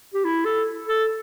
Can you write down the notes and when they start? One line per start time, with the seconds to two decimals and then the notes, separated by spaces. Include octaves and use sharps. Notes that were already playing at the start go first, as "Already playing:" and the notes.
0.14 G4
0.24 E4
0.45 A4
0.87 A4